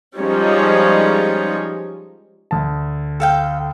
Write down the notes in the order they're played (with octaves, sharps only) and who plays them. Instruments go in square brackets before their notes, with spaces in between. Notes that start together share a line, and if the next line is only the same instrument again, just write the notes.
[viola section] F3 G3 G#3 C#4 D#4 C#5
[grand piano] D2 A5
[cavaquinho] A4 F5 G5